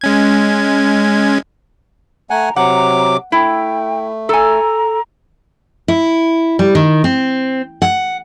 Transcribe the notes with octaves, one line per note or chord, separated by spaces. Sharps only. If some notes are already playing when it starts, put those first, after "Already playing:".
G#3 C#4 G#6
A3 F#5 G#5 A#5
C3 F#3 F#5 A#5 D6
A3 E4 G5
A4 G#5 A#5
E4
G3
D#3
C4
F#5